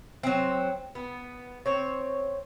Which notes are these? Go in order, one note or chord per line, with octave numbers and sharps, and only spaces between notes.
F#3 C4
B3
C4 C#5